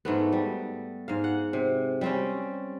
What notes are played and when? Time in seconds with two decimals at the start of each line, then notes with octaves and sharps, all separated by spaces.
0.05 G#2 A3 B3
0.32 G3
1.08 G#2 F5
1.24 F#5
1.53 C3
2.01 G3 C4 C#4